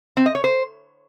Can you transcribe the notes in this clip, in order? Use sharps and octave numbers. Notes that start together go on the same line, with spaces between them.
C4
D#5
C#5
C5